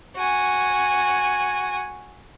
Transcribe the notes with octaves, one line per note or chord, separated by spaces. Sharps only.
F#4 G#5